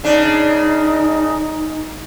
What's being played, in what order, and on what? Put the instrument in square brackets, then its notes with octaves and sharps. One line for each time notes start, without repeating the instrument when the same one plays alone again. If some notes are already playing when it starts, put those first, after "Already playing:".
[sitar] C#3 D4 [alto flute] D#4